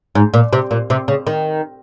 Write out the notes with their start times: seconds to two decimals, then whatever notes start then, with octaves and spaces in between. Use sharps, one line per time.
0.15 G#2
0.34 A#2
0.53 C3
0.71 A#2
0.90 C3
1.08 C#3
1.27 D#3